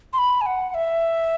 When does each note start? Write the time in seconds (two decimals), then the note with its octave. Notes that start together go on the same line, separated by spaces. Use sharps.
0.13 C6
0.18 B5
0.41 G#5
0.46 F#5
0.70 F#5
0.74 E5